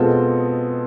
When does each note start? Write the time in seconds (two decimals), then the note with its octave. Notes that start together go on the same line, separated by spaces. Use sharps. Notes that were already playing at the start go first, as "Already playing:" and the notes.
Already playing: B2 G#3 C4 F4 A4